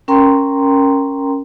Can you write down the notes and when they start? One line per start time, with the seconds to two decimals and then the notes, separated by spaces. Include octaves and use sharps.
0.08 C#4 A#4 G5 A#5 C6